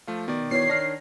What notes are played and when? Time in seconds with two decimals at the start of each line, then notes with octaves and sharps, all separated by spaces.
0.07 F3 A3 F4
0.28 B2 D#3 D5
0.51 B2 E3 C#5 C7
0.70 D#3 D4 F6 A#6